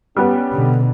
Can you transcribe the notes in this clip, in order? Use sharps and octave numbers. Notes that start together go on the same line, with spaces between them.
G3 B3 C#4 G4
B2 D3